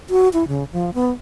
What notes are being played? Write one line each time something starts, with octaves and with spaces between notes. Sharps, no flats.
F#4
E4
C#3
F3
B3